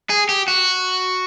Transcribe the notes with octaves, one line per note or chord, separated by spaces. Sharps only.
G#4
G4
F#4